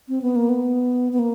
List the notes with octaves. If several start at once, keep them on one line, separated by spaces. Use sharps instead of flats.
C4
B3
A#3
B3
B3
A#3